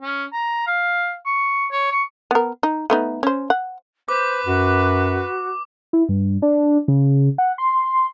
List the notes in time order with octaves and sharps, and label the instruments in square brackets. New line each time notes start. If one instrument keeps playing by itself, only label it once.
[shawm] C#4
A#5
F5
C#6
C#5
C#6
[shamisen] B3 A#4
D#4
A3 B3 D#4
C#4 C5
F#5
[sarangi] B4 [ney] C5 [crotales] D6
[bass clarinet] F#2 [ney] F#4
[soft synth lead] E4
G2
D4
C#3
F#5
C6